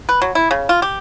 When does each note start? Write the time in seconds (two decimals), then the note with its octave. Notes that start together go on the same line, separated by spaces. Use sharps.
0.09 B4
0.22 F#3
0.35 E4
0.51 C#3
0.69 F4
0.82 G4